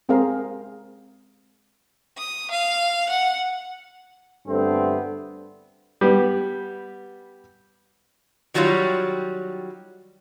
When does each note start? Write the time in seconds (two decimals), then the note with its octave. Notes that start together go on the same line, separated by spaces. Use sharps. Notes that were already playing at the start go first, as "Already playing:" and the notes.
0.09 G#3 C4 G#4 A#4 F5
2.18 D#6
2.51 F5
3.10 F#5
4.47 G2 D3 A3 B3 C4
6.01 G3 B3
8.54 D#3 F#3 G3 F4 C#5